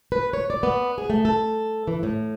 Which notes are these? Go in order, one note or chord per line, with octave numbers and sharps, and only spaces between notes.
B4
C#5
D5
B3
G#4
A3
A4
E3
A2